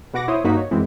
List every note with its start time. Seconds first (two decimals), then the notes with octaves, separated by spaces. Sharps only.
0.13 B2 B3 F#4 F#5 D6 A#6
0.28 E4 C5 C#5 D#6
0.44 G2 A#3 D#4 F#4 B6
0.57 C#5
0.71 F#2 E3 G#3 C4 E4